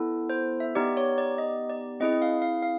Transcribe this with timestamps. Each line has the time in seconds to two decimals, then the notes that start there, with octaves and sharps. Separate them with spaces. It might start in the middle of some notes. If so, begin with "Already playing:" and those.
Already playing: B3 E4 A4
0.30 C5
0.60 E5
0.75 B3 D#4 G4 D5
0.97 C#5
1.18 D5
1.38 D#5
1.70 D5
2.00 C4 E4 G#4 D#5
2.22 F5
2.42 F5
2.63 F5